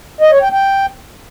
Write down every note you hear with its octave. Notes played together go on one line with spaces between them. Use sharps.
D#5
C#5
G5
G5